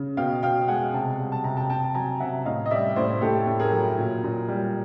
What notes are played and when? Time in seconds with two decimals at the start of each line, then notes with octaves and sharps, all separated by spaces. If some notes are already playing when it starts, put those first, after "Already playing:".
Already playing: C#3
0.17 B2 F5 G5
0.43 B2 F5 G5
0.68 G#3 F#5 G#5
0.93 C3 G5 A5
1.18 G3
1.32 A5
1.44 C3 A#5
1.57 G5 A5
1.70 C3 G5 A5
1.84 A5
1.95 F#3 G#5 A#5
2.20 C3 E5 F#5
2.45 A2 D#5 F5
2.66 D#5
2.71 G3 D5 E5
2.96 A2 C5 D5
3.21 A2 G4 A4
3.47 A2
3.59 G#4 A#4
3.72 F#3
3.98 A#2
4.24 A#2
4.48 G3